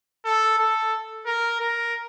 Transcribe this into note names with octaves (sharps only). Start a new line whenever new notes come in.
A4
A4
A#4
A#4